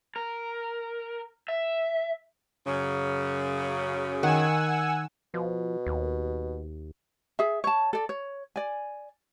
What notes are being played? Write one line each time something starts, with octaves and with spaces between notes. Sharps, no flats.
A#4
E5
F#2 C#3
D#3 F#5 G#5 E6
B2 F3
D#2
G#4 E5
C#5 A5
A4 D5
C#5
D5 G#5